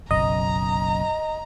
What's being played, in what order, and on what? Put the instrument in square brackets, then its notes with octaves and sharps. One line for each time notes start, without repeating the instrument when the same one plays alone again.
[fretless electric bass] F#1 B1 F#2 [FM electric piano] D#5 [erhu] A#5